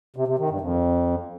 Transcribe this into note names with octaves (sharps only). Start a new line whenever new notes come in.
C3
C3
D#3
G2
F2